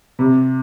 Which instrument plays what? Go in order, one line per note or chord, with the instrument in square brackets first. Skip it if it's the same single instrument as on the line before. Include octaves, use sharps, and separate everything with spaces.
[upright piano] C3